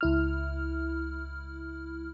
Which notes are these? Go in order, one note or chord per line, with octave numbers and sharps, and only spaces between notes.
C#2 E4 F6